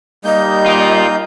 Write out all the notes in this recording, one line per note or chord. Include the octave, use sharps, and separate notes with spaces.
G3 A#3 D#4 D#5 G6
F4 A#4